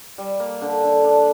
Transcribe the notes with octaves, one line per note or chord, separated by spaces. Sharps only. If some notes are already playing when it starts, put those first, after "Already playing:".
G3
A#3
D3
D3
D4